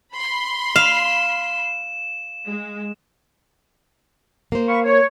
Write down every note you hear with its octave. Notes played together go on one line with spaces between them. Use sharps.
B5 C6
F5 E7
G#3
A#3 C5
F5 B5 C#6
C#5